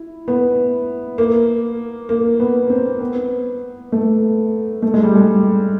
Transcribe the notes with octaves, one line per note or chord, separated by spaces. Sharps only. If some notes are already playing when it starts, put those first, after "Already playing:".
Already playing: E4
B3
A#3
A#3
B3
C4
B3
A3
A3
G#3
G3
G#3